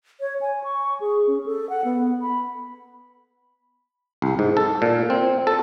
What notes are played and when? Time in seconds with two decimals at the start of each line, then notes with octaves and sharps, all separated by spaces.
0.21 C#5
0.41 G#5
0.64 C#6
1.00 G#4
1.27 C#4
1.46 A4
1.70 F#5
1.85 B3
2.22 B5
4.22 C2
4.39 G#2
4.57 A4
4.82 A#2
5.10 C4
5.47 A4